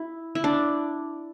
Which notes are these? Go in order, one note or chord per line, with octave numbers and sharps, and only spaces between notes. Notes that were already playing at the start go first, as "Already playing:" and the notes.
Already playing: E4
E4
D4